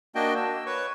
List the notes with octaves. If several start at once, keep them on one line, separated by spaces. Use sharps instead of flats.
A#3 D4 F#4 D#5 G5
E6
B4 C#5 C#6